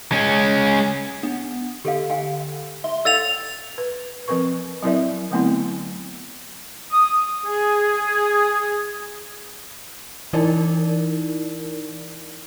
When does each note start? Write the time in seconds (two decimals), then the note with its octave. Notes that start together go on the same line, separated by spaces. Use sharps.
0.12 G#3 C#4
1.23 B3 D4
1.85 D3 G4 A4 F5
2.10 F5 G5 G#5
2.84 E5 C6
3.05 A4 D5 F5 G5 E6 A6 F7
3.78 B4
4.28 F3 C4 A#4 B4 C#6
4.83 F#3 C4 E4 A#4 D5 E5
5.31 D3 F#3 A3 B3 C4 E4
6.92 D#6
7.46 G#4
10.33 E3 D#4 E4 A#4 D5